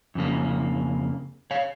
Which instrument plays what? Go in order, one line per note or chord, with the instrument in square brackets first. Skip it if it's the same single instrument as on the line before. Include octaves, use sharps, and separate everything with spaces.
[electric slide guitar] F2 C#3 A#3
C#5 F5